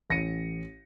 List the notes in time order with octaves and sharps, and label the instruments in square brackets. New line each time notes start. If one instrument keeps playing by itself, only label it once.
[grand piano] A1 A#6 C#7 D#7